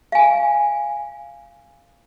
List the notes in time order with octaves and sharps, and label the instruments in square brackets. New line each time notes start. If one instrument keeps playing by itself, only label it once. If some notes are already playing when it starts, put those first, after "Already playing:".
[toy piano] F5 G#5